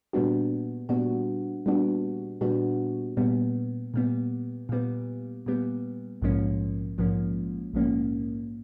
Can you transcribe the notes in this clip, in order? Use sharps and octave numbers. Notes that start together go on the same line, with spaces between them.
A#2 G3 B3 D4 F#4
A#2 G3 B3 D4 F#4
A#2 G3 B3 D4 F#4
A#2 G3 B3 D4 F#4
A#2 G3 B3
A#2 G3 B3
A#2 G3 B3
A#2 G3 B3
A#1 G#2 F3 A#3 C#4
A#1 G#2 F3 A#3 C#4
A#1 G#2 F3 A#3 C#4